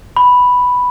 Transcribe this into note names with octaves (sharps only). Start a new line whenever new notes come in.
B5